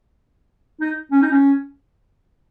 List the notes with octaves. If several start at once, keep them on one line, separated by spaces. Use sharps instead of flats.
D#4
C#4
D#4
C#4